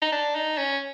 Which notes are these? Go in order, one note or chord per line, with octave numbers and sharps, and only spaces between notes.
D#4
D4
D#4
C#4